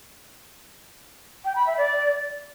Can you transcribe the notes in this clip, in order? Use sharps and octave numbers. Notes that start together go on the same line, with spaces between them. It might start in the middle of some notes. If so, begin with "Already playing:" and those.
G5
B5
E5
D5